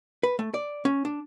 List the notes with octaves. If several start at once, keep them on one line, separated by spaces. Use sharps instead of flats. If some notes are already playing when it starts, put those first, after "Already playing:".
B4
A3
D5
C#4
D4